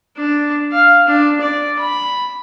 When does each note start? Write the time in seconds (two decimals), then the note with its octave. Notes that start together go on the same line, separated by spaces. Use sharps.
0.16 D4
0.72 F5
1.08 D4
1.41 D5
1.79 B5